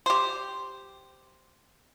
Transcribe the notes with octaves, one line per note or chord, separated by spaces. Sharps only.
G4 C5